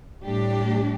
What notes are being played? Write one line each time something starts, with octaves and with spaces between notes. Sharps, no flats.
A2 G3 D4 G4